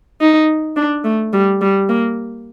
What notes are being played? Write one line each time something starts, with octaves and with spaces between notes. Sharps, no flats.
D#4
D4
A3
G3
G3
A#3